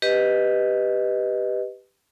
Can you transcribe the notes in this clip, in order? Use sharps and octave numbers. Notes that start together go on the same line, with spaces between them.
G4 B4 D#5